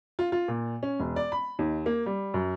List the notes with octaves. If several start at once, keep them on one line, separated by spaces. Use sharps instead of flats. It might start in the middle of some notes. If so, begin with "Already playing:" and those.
F4
F4
A#2
C#4
E1
D5
B5
D#2
A#3
G3
F#2